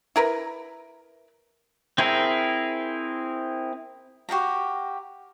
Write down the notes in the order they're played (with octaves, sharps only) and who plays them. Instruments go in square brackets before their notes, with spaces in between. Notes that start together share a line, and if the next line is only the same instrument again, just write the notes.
[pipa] E4 A#4 B4
[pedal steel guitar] C4 E4 G#4 A#4
[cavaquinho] F#4 G4 F5 A#5